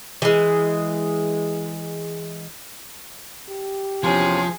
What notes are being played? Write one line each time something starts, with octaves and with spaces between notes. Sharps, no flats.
E3 G#3
G4
E2 C3 F3 C#4 G#4